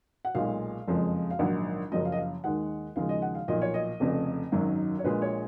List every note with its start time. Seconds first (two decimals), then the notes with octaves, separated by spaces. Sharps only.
0.25 F#5
0.35 B1 A#2 G#3 F5
0.87 F#1 F2 F3 G#3
1.31 F5
1.39 A#1 G#2 D#3 F#3 F#5
1.92 F#1 F#2 F3 D#5
2.05 F5
2.12 D#5
2.17 F5
2.44 D#2 D#3 G#3 F#5
2.96 D#2 C#3 F3 G#3 F5
3.09 D#5
3.22 F#5
3.35 F5
3.48 B1 A#2 F3 D#5
3.62 C#5
3.74 D#5
4.00 F1 F2 C#3
4.52 G#1 F#2 D#3 F#3
4.99 C#5
5.04 A#1 A#2 G#3 B4
5.22 C#5